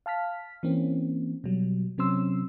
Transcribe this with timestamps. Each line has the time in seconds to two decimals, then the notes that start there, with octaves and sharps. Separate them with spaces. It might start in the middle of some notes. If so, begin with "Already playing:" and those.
0.06 F5 A5 F6 B6
0.63 E3 A#3 C4 C#4
1.44 B2 F#3 G3
1.98 C3 F#3 C4 C#4 C6 E6